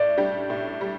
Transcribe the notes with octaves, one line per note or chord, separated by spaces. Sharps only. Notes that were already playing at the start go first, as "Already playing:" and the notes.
Already playing: A2 D5
G3 D4 G4
A2
G3